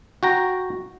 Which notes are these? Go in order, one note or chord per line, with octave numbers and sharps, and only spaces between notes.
F#4 G5 A#5